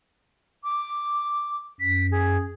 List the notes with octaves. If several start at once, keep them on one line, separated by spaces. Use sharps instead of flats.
D6
F#2 B6
G#4